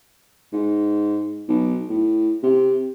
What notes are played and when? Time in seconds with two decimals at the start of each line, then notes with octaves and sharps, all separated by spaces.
0.53 G#2
1.49 B1
1.89 A2
2.43 C3